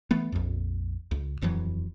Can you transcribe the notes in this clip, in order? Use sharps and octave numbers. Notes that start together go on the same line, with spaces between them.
E3 A3 B3
A#1 F2
C#2
D#1 F2 E3 F#3